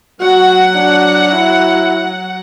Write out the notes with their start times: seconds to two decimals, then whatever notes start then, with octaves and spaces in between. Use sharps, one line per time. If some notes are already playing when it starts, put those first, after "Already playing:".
0.21 F#3 F#4 F#5
0.75 D4
1.33 E4